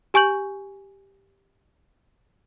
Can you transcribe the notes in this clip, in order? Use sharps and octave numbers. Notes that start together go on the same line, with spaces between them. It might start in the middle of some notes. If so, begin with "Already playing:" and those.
G4 G#5 C#6 G6 F#7